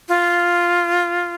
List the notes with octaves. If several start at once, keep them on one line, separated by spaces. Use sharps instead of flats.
F4